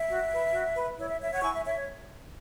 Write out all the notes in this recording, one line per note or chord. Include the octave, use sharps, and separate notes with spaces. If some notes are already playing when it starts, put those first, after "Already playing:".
Already playing: E5
F#4
B4
F#4
B4
E4 C#5
E5
C#5 E5
C#5 F#5
E4 G#5 C#6
E5
C#5 E5
C#5